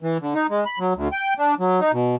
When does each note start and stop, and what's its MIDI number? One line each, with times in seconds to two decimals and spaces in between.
0.02 0.18 52
0.22 0.34 50
0.35 0.47 63
0.50 0.64 56
0.66 0.79 83
0.79 0.93 54
0.96 1.08 38
1.12 1.34 79
1.39 1.55 62
1.60 1.80 54
1.81 1.92 63
1.93 2.16 47